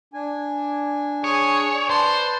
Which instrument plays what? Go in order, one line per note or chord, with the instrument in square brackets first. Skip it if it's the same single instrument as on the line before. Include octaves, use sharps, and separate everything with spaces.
[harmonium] D4 G#5
[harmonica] G#4 [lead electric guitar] C#5
[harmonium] B4 D5 [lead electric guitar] C5 [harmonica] A5 C6